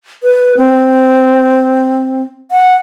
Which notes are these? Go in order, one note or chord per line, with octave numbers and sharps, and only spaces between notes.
B4
C4
F#5